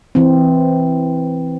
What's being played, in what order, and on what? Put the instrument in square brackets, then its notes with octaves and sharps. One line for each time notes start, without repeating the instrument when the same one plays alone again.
[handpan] E3 C4